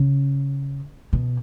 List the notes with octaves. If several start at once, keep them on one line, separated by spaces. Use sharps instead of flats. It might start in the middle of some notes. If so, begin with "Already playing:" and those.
Already playing: C#3
B2